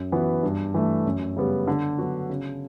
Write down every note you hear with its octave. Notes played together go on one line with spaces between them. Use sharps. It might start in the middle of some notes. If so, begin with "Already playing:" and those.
Already playing: F#2
E3 B3 F#4
G2
E3 A3
F#2
C#3 G3 B3
D3
F#3 B3 D4 F#4
C#3